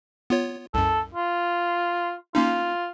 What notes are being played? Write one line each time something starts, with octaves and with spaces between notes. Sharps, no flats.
B3 F4 C#5
C2 F#2 A4
F4
A#3 C#4 D#4 F4